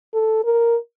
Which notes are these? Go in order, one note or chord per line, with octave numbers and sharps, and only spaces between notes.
A4
A#4